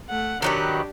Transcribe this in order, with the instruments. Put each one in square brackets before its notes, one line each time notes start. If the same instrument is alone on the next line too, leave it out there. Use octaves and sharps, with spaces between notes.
[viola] A3 F#5
[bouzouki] D#3 F#3 B4 [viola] D4 G4